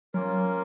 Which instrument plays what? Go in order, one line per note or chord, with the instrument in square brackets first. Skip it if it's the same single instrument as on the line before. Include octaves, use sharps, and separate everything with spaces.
[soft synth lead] F#3 [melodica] A#3 C#4 F4 A#4